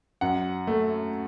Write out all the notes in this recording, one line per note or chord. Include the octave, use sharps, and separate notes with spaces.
F#2 F#5
A3